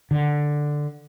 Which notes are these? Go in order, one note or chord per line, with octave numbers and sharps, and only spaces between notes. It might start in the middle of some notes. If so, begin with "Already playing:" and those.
D3